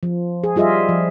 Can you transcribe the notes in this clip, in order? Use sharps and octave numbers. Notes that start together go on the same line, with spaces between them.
F3
G#4
G3 F4 G#4 D#5 E5
F3